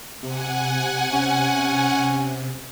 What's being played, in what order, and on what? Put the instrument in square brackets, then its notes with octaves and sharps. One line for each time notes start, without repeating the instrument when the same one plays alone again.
[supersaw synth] C3 [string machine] F#5 G#5
[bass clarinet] C#4